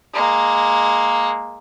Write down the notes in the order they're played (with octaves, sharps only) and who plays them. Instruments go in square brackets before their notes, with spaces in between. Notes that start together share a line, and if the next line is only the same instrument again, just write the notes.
[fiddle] G#3 A#3